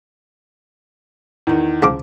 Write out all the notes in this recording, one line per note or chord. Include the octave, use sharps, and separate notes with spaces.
E2 D#3
C#2 F3 D6